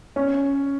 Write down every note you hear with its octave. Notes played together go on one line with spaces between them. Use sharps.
C#4